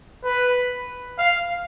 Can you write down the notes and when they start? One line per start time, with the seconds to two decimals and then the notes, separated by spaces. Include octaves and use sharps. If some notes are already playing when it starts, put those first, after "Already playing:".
0.25 B4
1.18 F5